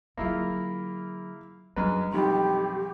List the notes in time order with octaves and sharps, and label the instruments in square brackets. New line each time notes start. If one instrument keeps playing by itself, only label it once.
[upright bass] D3 F#3 [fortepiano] A#3 E4 F4 [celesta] G#4 B5 A#6
[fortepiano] F#2 G#3 B4 [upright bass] G3 D4 [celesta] A#5
[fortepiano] B1 F2 D#3 [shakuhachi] G4 [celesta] B5 C6